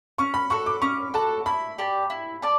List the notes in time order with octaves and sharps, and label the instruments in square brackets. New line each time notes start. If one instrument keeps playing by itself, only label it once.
[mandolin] C#4 [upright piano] C#6
[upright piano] B5
[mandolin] F#4 A4 [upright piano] C#6
[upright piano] D6
[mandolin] C#4 [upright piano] C#6
[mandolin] F#4 A4 [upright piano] A5
[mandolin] E4 [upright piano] B5
[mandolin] G4 D5 A5
E4
D5 A5